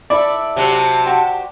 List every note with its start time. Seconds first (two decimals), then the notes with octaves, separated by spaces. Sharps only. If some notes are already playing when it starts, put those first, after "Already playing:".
0.10 E4 A4 D5 E5
0.56 C3 F#3 A5
1.05 F#4 G4 C5